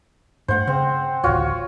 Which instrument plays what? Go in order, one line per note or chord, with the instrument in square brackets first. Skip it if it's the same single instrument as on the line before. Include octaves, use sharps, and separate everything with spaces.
[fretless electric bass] G2 A3 [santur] C5 F#5
[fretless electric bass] C#3 [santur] C4
[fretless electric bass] D1 A1 D2 [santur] F4 F#4 C#5